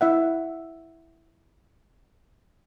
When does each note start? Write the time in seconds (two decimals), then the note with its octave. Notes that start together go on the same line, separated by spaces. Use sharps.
0.01 E4 E5 F#5